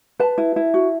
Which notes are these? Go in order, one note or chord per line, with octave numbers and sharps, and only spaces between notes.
B4 A5
E4
E4
F#4